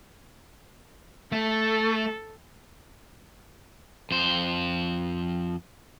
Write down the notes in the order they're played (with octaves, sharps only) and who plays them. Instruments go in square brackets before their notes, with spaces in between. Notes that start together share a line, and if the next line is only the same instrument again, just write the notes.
[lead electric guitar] A3 [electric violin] A4
[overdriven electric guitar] F2 C5